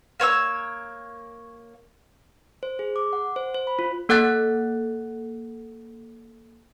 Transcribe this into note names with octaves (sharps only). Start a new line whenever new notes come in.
A#3 C#5 F#5 E6
C5
G#4
D6
F#5
C5
C5
B5
F4
A#3 A4 F#5 F#6 A6